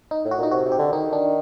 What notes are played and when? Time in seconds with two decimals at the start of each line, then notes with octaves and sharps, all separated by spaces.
0.11 D#4
0.25 A2
0.31 F#4
0.38 A#2 D#4
0.51 C3 F#4
0.65 C3
0.72 G4
0.79 D3
0.92 D#3 D#4
1.13 D4